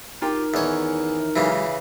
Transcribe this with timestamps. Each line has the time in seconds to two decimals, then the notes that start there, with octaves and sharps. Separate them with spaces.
0.22 D#4 F4 G4 A#4 G5
0.54 E2 D#3 E3 C#4 C#5
1.36 C#3 E3 F#3 G#3 G4